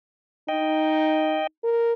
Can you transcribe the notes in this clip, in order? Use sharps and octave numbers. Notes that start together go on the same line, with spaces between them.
D#4 D#5 G5
A#4